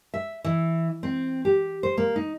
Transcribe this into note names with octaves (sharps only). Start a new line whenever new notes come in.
E5
E3
C4
G4
C5
A#3
D#4